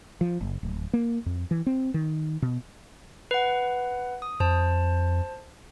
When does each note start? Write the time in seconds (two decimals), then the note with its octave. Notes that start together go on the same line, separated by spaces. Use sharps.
0.21 F3
0.41 F#1
0.63 D1
0.93 A#3
1.26 F2
1.51 E3
1.67 C4
1.94 D#3
2.42 B2
3.31 B4 F#5
4.22 D#6
4.40 F2 C5 A5